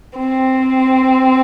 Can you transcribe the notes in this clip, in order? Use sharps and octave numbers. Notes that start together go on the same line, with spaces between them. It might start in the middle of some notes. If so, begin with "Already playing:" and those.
C4